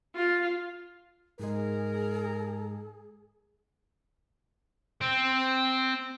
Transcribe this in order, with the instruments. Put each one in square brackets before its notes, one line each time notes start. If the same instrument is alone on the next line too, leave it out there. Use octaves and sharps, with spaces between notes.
[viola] F4
[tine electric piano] G#2 G#3 [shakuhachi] G#4 [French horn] A#4
[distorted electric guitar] C4